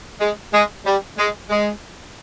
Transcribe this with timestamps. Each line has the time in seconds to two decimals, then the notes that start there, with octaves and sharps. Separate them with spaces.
0.20 G#3
0.52 G#3
0.85 G3
1.17 G#3
1.50 G#3